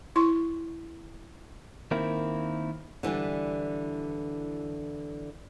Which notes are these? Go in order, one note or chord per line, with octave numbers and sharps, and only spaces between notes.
E4 C6 C#6
D#3 A#3 C4 E4
D3 E3 G3 E4